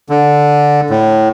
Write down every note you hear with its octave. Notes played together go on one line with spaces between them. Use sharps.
D3
A2